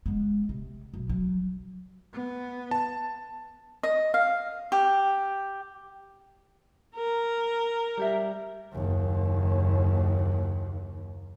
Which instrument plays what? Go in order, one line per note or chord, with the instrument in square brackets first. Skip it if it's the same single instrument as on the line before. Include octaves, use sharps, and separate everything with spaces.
[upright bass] G#3 B3
C3
B1
F#3
[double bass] B3
[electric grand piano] A5
[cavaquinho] D#5
F5
G4
[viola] A#4
[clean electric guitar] G3 G4 E5
[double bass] F#1 D#2